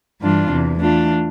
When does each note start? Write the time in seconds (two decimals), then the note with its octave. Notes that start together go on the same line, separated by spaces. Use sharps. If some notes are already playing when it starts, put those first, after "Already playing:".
0.21 G2 E3 G3 D4 F4
0.50 E2 C3 E3
0.80 E3 A3 D4 F4